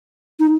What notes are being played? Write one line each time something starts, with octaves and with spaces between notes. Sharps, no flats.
D#4